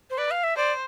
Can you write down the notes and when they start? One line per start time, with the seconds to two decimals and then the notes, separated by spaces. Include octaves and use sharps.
0.10 C5
0.18 B4 D5
0.31 F5
0.44 E5
0.56 C5 D5